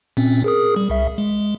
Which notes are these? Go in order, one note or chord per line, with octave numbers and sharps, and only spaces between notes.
A#2 C4 C#4
G#4 A#4 D#6
G3
C2 E5
G#3